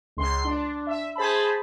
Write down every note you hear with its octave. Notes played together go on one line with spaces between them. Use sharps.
C#2 C6
D4
E5
G#4 C5 A5 B5